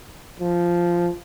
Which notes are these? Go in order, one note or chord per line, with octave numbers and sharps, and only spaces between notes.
F3